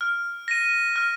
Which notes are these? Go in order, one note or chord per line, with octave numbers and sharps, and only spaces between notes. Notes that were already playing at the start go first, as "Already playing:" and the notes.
F6
A#6 D#7
F6